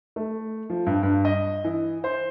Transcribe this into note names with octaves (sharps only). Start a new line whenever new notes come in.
A3
F3
G2
G2
D#5
E3
C5